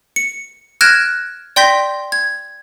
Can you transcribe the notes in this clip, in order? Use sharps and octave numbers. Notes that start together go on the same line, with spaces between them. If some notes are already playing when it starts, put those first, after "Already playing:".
C#7
F6 F#6 G#6 A#6 D7 E7
D5 G5 C6 G6 A#6 B6
G#6